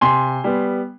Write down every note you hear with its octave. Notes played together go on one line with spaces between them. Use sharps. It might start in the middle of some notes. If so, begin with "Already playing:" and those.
C3 G#5 C6
G3 B3